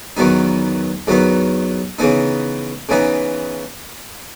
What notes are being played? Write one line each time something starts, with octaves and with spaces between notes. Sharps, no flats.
E2 D#3 F#3 B3 D#4
E2 D#3 F#3 B3 D#4
C#3 E3 B3 D#4
C#3 E3 B3 D#4